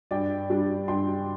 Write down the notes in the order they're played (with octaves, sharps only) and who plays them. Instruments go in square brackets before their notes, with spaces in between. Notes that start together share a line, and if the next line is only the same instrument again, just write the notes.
[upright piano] G2 D5 G5
G3 D4
G2 G5 C6